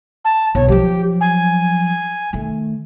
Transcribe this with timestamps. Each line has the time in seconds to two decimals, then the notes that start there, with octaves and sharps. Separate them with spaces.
0.24 A5
0.55 B1 C#5
0.68 F3 F#3 G4
1.20 G#5
2.33 D#3 A3